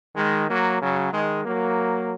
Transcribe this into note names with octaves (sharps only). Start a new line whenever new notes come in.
D#3 G#3
F#3 A#3
C#3 F#3
D#3 G#3
F#3 A#3